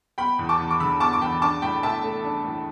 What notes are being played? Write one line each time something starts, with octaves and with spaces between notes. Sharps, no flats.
B3 G5 B5
E2
A5 D6
E2
D6
D3 B5 E6
B3 A5 D6
D6
E2 G5 B5
D4 A5 D6
A2 G5 B5
A2 E5 A5
A3
D4
A2